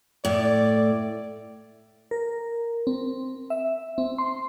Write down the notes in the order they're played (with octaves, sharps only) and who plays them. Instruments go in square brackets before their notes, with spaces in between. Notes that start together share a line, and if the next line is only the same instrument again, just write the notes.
[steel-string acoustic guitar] A2 [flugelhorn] D5
[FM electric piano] A#4
C4
E5
C4
C6